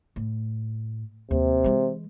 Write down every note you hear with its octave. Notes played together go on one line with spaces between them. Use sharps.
A2
D#2 C3
E3 G#3